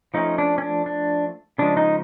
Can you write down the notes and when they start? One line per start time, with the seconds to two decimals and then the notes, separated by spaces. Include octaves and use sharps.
0.14 F3 A3 C#4 D#4
0.38 D4
0.58 C#4
0.62 D4
0.86 D4
1.58 C#3 F3 G#3 D4
1.77 D#4